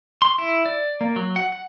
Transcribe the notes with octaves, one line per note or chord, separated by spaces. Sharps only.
C6
E4
D5
A#3
F#3
F#5
F#5